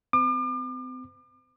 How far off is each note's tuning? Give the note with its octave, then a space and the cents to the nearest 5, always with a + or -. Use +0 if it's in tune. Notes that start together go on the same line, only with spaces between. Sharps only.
C4 -40 D6 +40